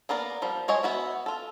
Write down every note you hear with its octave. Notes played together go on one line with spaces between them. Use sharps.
A#3 B3 A#4 D5
F3 G3
G#3 C#5 D#5 G#5
B3 F#4 E5
F4 A4